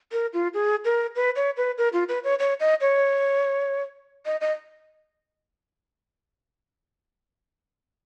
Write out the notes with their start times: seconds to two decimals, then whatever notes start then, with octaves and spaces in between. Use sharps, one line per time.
0.12 A#4
0.34 F4
0.54 G#4
0.85 A#4
1.16 B4
1.36 C#5
1.57 B4
1.78 A#4
1.93 F4
2.09 B4
2.24 C#5
2.39 C#5
2.60 D#5
2.81 C#5
4.26 D#5
4.41 D#5